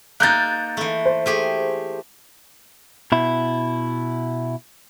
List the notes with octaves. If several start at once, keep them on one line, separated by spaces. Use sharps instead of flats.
A#3 D#4 F#6 G6 A6
E3 A3
C5
A3 G4 G#4
B2 E4